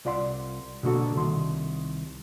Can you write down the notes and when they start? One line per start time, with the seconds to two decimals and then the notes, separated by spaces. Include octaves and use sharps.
0.05 C2 F4 D5 F#5 C6
0.83 B2 D3 A#3 F#4 A4
1.16 C2 D#3 C6